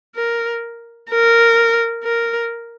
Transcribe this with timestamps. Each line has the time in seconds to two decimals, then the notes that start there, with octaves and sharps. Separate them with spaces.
0.15 A#4
1.10 A#4
2.04 A#4